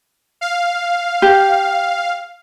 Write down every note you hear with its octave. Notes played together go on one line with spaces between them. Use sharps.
F5
G4